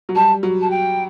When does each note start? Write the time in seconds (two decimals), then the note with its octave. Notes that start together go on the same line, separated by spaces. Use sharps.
0.09 F#3
0.15 G3 A5
0.43 F#3
0.61 A5
0.70 G5